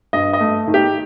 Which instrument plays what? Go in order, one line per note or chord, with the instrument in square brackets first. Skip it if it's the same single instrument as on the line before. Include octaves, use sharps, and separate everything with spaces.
[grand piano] G2 D#5
D#5
A3
D#3
G4